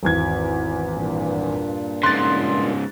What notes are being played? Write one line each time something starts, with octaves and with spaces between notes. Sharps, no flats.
G#1 E2 G#6
G2 A#2
G#2 C#3 C6 F#6 A6